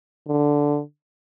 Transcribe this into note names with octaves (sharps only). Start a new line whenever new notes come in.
D3